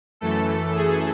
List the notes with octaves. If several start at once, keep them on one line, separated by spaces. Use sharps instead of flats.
F#2 E3 A3 A4
G#4